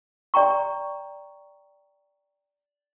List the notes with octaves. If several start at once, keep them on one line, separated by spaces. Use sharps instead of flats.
D5 G5 A#5 C#6